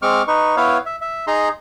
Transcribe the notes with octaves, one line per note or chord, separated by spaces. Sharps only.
G#3 C4 C#6 D6 F6
D#4 B4 C#6
B3 E4 B4 C#5 F5
E5
E5
D#4 G#4 A#5 C6